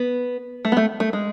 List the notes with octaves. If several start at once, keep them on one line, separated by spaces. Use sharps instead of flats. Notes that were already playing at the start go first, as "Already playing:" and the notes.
Already playing: B3
A3
B3
A3
A3
G#3